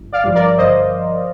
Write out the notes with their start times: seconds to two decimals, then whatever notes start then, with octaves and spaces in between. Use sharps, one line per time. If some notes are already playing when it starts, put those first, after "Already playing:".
Already playing: G1
0.13 D5 F5
0.24 G2 F3
0.35 A#4 D5
0.58 G1 C5 D#5